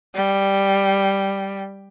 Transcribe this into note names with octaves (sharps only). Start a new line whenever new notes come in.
G3